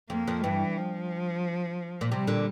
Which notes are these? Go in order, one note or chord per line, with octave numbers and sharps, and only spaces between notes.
F2 A#3
F2
G2 E3
F3
A#2
C3 G3
A#2 D3